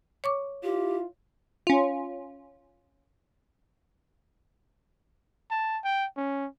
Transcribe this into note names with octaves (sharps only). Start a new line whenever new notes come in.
C#5 C#6 D6
E4 F4 G4
C#4 F4
A5
G5
C#4